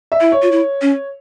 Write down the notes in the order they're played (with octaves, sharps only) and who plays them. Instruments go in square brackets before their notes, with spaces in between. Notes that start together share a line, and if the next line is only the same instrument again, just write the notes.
[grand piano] E5
[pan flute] E4
[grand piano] C#5
[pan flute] F4
E4
C#4